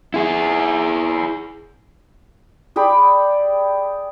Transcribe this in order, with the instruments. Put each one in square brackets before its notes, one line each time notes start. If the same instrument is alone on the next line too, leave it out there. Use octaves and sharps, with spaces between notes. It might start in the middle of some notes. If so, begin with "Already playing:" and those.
[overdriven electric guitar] E4 G#4
[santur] G4 G#4 D5 B5